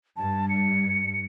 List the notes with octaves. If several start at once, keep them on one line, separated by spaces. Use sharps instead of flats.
G2 A5
C#7